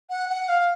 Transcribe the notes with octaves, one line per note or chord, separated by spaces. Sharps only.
F#5
F#5
F5